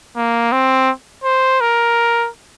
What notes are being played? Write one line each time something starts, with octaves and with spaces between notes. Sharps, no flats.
A#3
C4
C5
A#4